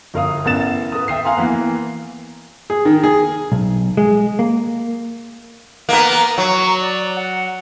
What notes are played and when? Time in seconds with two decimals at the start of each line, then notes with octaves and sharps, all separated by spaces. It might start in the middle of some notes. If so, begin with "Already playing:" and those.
0.14 G1 A#4 F5 D#6
0.45 A1 B3 A#4 F#5 A6 E7
0.92 A#4 B4 D#6
1.08 E5 G5 D#6 C7
1.25 F5 F#5 G#5 A#5 C6
1.37 E3 A#3 B3
2.70 G#4
2.85 D#3
3.03 G#4
3.52 B1
3.97 G#3
4.39 A#3
5.89 A#3 B3 A#5
6.38 F#3 C#6
6.81 D5
7.16 F#5